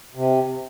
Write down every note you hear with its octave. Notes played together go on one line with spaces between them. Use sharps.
C3